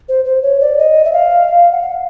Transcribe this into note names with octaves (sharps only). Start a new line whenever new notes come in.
C5
C5
C#5
D5
D#5
E5
F5
F#5
F5